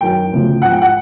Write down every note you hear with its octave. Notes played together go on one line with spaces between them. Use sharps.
F#2 D#3 F#3 G5
D2 C#3 F3
G#2 F3 F#5
G5
F#5